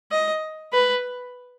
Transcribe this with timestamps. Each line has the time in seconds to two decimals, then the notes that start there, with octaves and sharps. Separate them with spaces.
0.12 D#5
0.73 B4